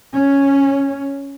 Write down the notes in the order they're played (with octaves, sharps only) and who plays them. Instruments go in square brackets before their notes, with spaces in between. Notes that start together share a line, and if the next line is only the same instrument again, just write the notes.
[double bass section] C#4